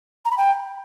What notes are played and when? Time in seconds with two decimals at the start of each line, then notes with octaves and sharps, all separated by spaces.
0.25 A#5
0.31 B5
0.37 G5